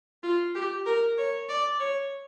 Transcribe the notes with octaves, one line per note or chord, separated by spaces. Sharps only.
F4
G4
A#4
C#5
D5
C#5